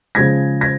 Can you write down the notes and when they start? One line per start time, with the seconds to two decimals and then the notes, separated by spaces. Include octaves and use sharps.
0.15 C#3 F3 G#3 G#6 A#6
0.61 G#6 A#6